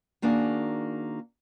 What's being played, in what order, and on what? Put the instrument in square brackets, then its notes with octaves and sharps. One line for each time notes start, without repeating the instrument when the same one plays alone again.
[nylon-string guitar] D#3 A#3 D4 F#4 G#4